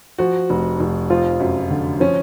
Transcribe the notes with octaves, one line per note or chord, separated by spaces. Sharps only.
F3 F#4
F1
F1
F3 F4
F#2
D3
F3 C#4